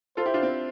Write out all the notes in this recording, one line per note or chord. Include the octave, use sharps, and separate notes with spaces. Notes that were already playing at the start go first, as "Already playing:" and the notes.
F4 A4 C5
E4 G4
D4 F4
C4 E4